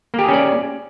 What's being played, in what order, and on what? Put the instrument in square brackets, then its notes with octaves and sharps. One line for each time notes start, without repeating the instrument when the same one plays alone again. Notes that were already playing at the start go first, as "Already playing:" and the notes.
[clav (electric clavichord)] A#3
G4
G#4
C#4
D5